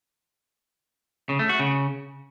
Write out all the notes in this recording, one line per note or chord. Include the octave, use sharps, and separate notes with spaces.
C#3
A3
F#4
C#3